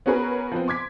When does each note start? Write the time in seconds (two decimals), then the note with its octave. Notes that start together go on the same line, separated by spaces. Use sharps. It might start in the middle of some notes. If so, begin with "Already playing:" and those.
0.06 B3 C#4 F#4 G#4 A#4 B4
0.52 F3 B3 C4
0.68 C6 D6 G#6 B6